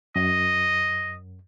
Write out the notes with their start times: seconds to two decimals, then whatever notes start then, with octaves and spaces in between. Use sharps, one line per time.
0.16 F#2 D#5